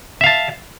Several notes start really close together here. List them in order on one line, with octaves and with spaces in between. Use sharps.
E5 F5 A5